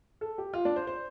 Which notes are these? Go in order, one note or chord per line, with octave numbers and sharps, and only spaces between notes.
A4
G4
F4
D4
C5
C5